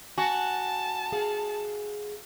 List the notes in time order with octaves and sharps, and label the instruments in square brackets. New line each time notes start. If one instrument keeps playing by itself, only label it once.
[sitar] F#4 [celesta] G#5 [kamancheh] A5
[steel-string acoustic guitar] G#4 F5 F#5